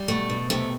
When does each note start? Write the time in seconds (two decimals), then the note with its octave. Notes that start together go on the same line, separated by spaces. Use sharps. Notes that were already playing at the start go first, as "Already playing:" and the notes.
Already playing: G3
0.08 B2 A3
0.30 B2
0.50 C3 A3